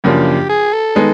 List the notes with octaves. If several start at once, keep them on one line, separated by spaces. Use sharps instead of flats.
F#2 C#3 F3 A#3 D4 G4
G#4
A4
D#3 G#3 B3 D#4